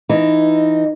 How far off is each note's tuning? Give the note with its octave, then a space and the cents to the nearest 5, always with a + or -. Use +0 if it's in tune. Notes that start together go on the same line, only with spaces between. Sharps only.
E3 +10 D#4 +0